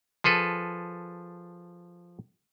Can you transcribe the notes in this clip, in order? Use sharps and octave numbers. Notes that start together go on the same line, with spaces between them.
F3 G#4 A4 B4